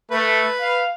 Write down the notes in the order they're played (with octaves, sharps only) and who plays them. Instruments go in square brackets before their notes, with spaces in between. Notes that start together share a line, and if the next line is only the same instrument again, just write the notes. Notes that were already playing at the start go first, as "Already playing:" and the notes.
[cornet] A3 [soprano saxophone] B4
[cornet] F5